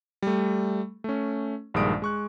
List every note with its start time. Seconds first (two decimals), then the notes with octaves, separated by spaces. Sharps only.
0.22 G3 A3
1.04 A3 C#4
1.74 A#1 G2 D#3 G#3 D#6 D7
2.02 G#3 C#6 F#6